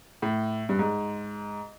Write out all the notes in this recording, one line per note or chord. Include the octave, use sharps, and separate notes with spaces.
A2
G2
G#2